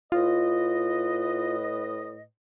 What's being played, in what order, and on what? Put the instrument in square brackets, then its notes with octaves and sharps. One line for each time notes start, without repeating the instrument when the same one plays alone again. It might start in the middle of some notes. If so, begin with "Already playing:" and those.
[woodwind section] A2 B4 D#5 [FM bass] F4